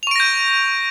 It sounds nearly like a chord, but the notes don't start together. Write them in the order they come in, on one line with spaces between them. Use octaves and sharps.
F7 C#6 D7 A#6 G6